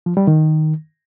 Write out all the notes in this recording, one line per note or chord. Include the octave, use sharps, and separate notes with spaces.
F3
G3
D#3